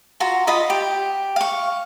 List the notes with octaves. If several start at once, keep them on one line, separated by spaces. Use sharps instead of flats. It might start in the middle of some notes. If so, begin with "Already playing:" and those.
F4 F#4 A#5
F4 D#5 B5 D#6
G4
F5 C#6